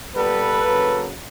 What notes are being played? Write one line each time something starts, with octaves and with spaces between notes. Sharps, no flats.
A#2 G3 B3 A4 B4
C#3 F#3 A#3